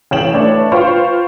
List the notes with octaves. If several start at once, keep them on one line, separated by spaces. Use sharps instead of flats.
A1 C#4 G5 E7 F#7
A3 D4 B4 C#5
F4 B4 C5 F5 G5 C#6